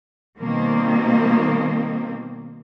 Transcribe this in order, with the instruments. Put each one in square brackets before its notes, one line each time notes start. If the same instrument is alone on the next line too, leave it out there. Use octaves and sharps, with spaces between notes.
[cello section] B2 D#3 G3 A#3 C4